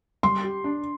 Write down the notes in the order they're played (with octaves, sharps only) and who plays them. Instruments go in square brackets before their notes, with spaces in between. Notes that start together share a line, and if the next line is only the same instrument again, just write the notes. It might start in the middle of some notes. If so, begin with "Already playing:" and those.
[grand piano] G3 [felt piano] C6
[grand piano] G4
D4